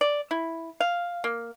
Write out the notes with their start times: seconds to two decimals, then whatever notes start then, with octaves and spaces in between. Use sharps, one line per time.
0.01 D5
0.31 E4
0.80 F5
1.24 A#3